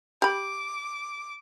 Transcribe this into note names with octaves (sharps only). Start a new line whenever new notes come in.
G4 B5 D6